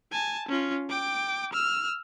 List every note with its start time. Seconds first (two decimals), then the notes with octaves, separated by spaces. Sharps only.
0.11 G#5 A5
0.48 C#4 F4
0.89 G5 D6
1.53 E6 F6